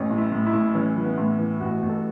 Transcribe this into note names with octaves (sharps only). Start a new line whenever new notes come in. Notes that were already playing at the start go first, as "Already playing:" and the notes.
Already playing: A1 C#4
A2
E4
A2
E4
A2
E3 C#4
E3
B3
A2
E3
A1 F#4
A1
A4